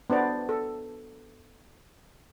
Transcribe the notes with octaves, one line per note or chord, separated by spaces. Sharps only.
B3 D4 C5 D5
A4